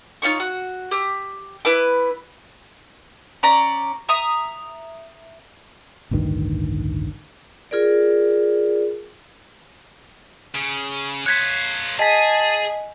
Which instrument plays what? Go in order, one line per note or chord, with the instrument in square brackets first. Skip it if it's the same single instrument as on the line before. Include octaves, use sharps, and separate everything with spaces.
[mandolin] D#4 F4 C#5 C#6
F#4
G4 E6
E4 B4 D6
C#4 D5 A#5
E5 A#5 D#6
[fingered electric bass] A1 D2 G2 D#3
[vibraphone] F4 G#4 A#4 D5
[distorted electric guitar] C#3
[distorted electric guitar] F4 C#5 [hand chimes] F#6 G#6 B6
[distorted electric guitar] G#4 [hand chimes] D#5 G#5 B6 [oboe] A5